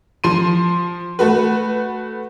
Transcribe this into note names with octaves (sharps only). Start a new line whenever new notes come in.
F3 C6 D#7
A3 F#4 B4